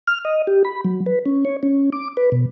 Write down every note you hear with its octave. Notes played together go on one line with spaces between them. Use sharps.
F6
D#5
G4
B5
F#3
B4
C#4
C#5
C#4
D6
B4
B2